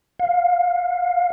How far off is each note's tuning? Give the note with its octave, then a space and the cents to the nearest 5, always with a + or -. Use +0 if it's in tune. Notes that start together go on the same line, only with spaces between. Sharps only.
F5 +25